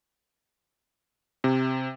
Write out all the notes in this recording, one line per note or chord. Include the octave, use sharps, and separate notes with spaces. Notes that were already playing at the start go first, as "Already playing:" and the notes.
C3